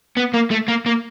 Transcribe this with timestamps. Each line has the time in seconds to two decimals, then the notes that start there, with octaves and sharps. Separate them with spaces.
0.17 B3
0.34 A#3
0.51 A3
0.68 A#3
0.86 A#3